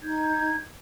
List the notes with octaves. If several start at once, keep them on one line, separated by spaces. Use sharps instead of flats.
D#4 G6 G#6